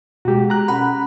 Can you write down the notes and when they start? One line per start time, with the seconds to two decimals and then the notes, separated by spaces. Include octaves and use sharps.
0.25 B2 G#3 F#4 G4
0.50 A#5 F#6
0.68 C#4 A4 F#5 B5